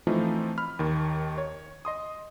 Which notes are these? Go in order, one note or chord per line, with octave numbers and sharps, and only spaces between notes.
E3 F3 A3 C4 D#4 F4
B5 F6
D#2 D#3
C#5
D#5 C6 D#6